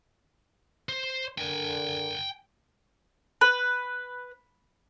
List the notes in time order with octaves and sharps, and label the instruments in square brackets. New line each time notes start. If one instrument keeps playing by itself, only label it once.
[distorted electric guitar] C5
[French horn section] D3 A#4 [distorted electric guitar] G5 G#5
[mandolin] B4